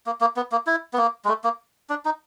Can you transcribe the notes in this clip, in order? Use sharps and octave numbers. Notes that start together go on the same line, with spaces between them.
A#3
A#3
B3
A#3
E4
B3
A#3
G#3
A3
A#3
D4
D#4